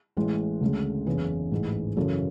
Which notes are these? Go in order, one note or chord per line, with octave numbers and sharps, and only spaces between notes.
A1 A2 E3 G#3
D2 C#3 G#3
F#1 E2 C#3 E3 G#4 B4
A1 G#2 G#3
F#2 C#3 E3 F#4 A4